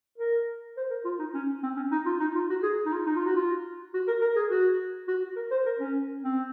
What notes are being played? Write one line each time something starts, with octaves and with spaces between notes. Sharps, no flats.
A#4
C5
A#4
F4
D#4
C#4
C4
C#4
D#4
F4
D#4
F4
F#4
G#4
D#4
F4
D#4
F4
F#4
F4
F#4
A#4
A#4
G#4
F#4
F#4
A#4
C5
A#4
C#4
C4